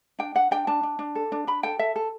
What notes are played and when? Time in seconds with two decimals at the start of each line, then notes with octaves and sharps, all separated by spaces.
0.19 D4 G5
0.35 D4 F#5
0.51 D4 G5
0.67 D4 A5
0.83 D4
0.99 D4
1.15 A4
1.32 D4
1.47 D4 B5
1.63 A4 G5
1.79 A4 E5
1.96 A4